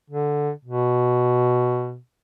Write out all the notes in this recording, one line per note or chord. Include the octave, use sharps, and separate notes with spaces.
D3
B2